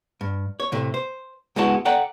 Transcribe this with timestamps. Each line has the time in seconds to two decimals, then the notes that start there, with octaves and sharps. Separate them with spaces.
0.21 G2
0.60 C#5
0.72 A2 C3 A3
0.94 C5
1.56 C#2 G#3 B3 E4 F#4 A5
1.85 A4 D5 F#5 G5 A#5